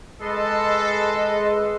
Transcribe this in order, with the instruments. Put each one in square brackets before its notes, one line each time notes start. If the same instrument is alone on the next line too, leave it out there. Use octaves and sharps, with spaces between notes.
[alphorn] G#3 [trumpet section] A4 [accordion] B4 D#5 C6